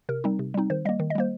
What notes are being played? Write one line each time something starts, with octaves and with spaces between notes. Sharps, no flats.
C3 A#4
G3 C4 D#4
C3
G3 C4 D#4
D#3 C5
G3 A#3 D#5
D#3
D#5
G3 A#3 C5